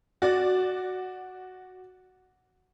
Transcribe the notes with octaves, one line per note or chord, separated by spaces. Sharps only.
F#4 D5